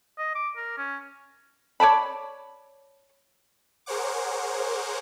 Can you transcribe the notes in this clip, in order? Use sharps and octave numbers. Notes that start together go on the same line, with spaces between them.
D#5
D6
A#4
C#4
C#5 D5 A5 B5
G#4 A#4 C5 C#5 F#5 D6